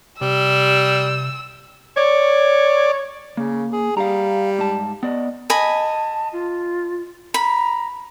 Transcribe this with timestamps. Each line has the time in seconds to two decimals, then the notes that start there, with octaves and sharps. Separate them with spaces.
0.21 C3 G3 E6
1.97 C#5 D5
3.37 C#3 A#3
3.72 G#4
3.97 G3 F5 A#5
4.59 G#2 A5
5.03 B3 D5 D#5
5.50 D#5 G#5 A5 B5
6.33 F4
7.34 A#5 B5